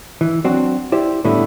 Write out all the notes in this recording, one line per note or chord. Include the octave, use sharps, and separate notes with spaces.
E3
F#3 C4 D4 F#4
E4 G4 C5 D5
A2 D3 G3 B3 E4